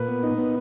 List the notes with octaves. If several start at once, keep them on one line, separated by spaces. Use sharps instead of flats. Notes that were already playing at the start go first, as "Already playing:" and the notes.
Already playing: A#2 B4
B3
D#4
B3